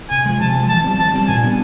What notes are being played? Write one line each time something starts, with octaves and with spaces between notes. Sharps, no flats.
C3 G#5
F3 G#3
C3 A5
F3 G#3
E3 A5
G3 C4
E3 A5
G3 C4
A#2 G#5
G3 B3 D4